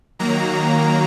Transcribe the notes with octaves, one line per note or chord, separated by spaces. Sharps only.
D#3 F#3 A#3 A#5